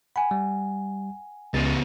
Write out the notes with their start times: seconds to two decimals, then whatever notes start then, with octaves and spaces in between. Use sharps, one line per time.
0.16 F#5 G#5 B5
0.31 G3
1.54 C#2 C#3 B3 C#4 A6